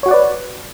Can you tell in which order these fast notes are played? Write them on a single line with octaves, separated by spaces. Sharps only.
C#5 F#4 F#5 D5 B4